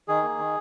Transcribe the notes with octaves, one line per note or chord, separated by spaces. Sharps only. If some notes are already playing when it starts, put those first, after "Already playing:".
D#3 G#4
A#3
D#3